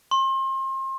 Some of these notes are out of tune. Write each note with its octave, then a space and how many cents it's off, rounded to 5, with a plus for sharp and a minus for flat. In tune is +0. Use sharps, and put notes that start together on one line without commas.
C6 +35